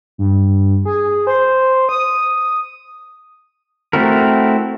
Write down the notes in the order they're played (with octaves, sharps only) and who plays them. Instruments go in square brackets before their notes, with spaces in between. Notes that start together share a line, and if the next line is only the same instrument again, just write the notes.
[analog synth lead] G2
G#4
C5
D#6
[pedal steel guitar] A3 C4 E4 F#4 A#4